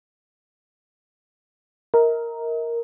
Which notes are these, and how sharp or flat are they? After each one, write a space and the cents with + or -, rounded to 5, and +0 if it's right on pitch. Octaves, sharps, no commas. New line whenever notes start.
A#4 +0 D#5 +45